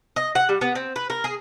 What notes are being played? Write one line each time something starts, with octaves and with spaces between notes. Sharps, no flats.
D#5
F#5
G3
B3
C4
B4
A#4
G#4